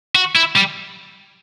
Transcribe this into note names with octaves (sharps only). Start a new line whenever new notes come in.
F#4
E4
G3